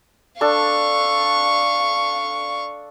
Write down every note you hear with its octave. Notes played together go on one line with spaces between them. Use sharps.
D4 A4 F5 C#6